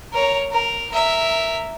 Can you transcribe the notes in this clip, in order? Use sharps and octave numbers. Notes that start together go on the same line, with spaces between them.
A#4 C#5
A#4
A#4 E5